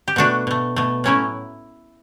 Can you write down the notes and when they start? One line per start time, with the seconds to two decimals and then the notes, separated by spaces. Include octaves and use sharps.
0.08 G4
0.16 B2 A3 D4 F#4
0.47 B2 A3
0.76 B2 A3
1.04 A2 F#3 A3 C#4 E4